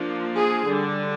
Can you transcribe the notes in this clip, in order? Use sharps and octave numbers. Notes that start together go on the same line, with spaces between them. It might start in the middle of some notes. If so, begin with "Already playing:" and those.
Already playing: F3 A#3 D4
G#4
D3 G3 D4